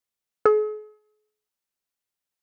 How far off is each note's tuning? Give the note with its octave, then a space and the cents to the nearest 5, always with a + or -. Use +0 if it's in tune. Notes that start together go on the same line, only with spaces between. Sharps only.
G#4 +40